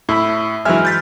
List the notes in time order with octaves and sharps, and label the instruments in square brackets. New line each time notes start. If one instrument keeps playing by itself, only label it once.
[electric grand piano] A2 [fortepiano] E4 B5
[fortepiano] E3 F#3 G#3 [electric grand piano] E5 G#5 F6
[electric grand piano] G6 A6 B6